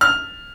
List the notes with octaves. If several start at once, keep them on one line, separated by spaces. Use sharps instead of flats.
F6